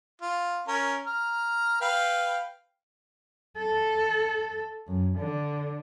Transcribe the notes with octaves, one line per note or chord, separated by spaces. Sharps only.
F4
C#4 A#4
A#5 F6
B4 F5 G5
A4
F#2
D3